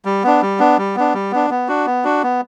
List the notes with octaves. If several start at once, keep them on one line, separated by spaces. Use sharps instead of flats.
G3
B3 D4
G3
B3 D4
G3
B3 D4
G3
B3 D4
B3
D4 F#4
B3
D4 F#4
B3